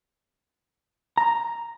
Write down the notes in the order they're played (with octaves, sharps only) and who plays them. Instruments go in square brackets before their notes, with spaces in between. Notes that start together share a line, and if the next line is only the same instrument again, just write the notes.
[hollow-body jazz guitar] A#5